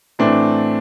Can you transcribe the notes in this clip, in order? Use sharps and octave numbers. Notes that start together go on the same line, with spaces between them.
A2 E3 A3 C4 D4